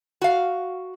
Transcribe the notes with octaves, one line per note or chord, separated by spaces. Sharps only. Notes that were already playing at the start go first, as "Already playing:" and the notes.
F#4 F5